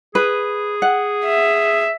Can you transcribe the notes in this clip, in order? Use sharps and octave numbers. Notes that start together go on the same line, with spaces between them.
G#4 B4
F#5
E5